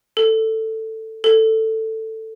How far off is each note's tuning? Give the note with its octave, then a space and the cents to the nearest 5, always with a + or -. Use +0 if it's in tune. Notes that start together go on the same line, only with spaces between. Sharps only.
A4 +10
A4 +10